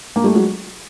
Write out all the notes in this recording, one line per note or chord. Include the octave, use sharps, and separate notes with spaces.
A#3
G3 A3
F#3 G#3